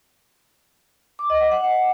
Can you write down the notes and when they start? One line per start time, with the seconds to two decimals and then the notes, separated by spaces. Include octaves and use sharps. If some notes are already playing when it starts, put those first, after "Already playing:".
1.19 D6
1.30 D#5
1.41 F#5
1.51 F#5